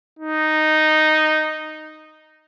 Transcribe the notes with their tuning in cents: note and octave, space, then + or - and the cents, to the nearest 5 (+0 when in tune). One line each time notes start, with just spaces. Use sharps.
D#4 -5